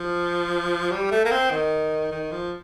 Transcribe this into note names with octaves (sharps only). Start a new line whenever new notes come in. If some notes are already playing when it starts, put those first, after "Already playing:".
Already playing: F3
G3
A3
A#3
C4
D#3
D#3
F3